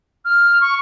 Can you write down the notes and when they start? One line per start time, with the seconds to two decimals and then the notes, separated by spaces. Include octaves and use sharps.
0.25 F6
0.61 C#6